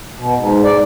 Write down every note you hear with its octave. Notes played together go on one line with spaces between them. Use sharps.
B2
G#2
D5